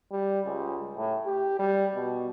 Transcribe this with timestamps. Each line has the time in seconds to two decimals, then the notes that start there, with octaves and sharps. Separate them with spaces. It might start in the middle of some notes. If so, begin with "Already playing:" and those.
0.11 G3
0.46 C#2
0.97 A2
1.25 G4
1.59 G3
1.95 B2